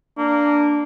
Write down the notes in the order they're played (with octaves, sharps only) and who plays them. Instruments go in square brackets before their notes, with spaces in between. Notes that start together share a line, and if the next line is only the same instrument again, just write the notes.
[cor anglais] A#3 [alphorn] D4